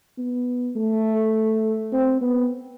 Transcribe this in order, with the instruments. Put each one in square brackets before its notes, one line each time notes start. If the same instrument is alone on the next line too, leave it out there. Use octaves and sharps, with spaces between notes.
[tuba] B3
A3
C4
B3